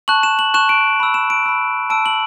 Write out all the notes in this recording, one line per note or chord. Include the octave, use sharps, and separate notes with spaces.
A5 C#6 F#6 F#7
E7
F#7
A5 C#6 F#6 E7
D7
B5 E6
E7
D7
B5 E6
A5 E6 D7
F#7